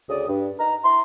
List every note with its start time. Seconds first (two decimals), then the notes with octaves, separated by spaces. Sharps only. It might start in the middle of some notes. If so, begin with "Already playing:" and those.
0.09 D2 C#3 D5 D#6
0.28 G2
0.58 D#4 B4 A#5
0.82 E4 A#5 C6